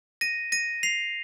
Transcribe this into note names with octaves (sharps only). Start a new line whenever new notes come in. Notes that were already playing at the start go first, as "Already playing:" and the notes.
A#6 D#7
A#6 D#7
C7 F7